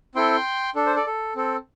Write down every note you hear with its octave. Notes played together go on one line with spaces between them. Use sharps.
C4 E4 A4 G5 C6
D4 A4
C5
A4 D5
A4
C4 A4